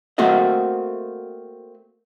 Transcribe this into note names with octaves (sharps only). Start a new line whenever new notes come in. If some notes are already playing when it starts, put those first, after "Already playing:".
A3 A#3 C4 F#4 A4 D#5